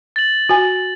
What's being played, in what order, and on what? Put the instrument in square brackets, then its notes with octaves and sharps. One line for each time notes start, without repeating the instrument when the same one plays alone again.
[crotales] A6 F#7
[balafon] F#4 G#5